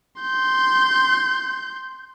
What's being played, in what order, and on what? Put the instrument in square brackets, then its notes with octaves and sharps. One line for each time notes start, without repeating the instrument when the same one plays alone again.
[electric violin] C6 G6